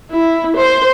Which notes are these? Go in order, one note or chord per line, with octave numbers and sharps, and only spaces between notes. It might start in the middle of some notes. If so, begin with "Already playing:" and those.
E4
C5